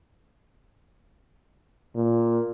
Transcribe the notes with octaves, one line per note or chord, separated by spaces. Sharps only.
A#2